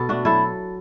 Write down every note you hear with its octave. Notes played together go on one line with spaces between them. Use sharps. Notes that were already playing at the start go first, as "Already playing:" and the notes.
Already playing: B2 B3 A4
A3 D4 F#4
F#3 E4 A4